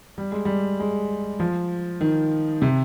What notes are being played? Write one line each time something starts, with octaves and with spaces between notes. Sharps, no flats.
G3
G#3
G3
G#3
F3
D#3
C3